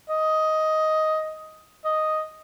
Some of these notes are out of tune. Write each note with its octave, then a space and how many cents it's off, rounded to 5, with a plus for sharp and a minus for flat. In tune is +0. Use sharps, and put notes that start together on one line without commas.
D#5 +10
D#5 +0